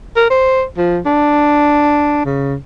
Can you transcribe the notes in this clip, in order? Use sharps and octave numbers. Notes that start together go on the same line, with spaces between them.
A#4
C5
F3
D4
C#3